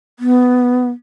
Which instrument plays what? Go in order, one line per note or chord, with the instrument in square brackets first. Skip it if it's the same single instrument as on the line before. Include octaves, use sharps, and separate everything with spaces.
[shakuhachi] B3